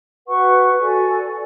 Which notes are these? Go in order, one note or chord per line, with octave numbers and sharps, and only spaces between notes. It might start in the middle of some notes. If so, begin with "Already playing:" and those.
F#4 B4 F#5 C#6
F#4 A4 D5 G#5